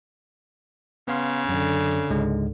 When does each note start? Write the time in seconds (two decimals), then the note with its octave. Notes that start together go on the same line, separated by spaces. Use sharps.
1.08 C#3 B3 F5 C6
1.49 F#2 D3
2.11 C#2 G#2 G#3